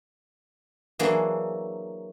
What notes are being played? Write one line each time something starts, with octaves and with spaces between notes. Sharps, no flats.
E3 F#3 A#3 D4 E4 G#4